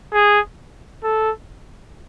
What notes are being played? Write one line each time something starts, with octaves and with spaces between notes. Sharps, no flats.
G#4
A4